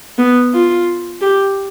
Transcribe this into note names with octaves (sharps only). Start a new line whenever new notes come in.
B3
F4
G4